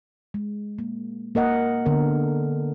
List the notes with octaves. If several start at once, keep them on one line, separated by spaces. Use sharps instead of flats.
G#3
A#3
A#3 A#4 D#5 F#5
D3 B3 A#4